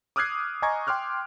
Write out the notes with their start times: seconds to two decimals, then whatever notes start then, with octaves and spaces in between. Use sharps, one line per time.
0.16 D6 D#6 F6 F#6 G#6 C7
0.62 D#5 G#5 A#5 C#6 G#6
0.87 G5 C6 D6 F6 F#6